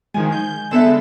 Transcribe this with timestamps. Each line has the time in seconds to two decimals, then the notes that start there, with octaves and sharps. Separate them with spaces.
0.14 D#3 F3 G#3 G#5
0.32 G6
0.71 D3 B3 A4 E5 E7
0.84 G#3